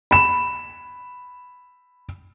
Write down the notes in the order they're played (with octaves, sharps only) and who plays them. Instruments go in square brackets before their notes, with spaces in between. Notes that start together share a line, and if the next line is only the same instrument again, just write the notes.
[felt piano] B5 E7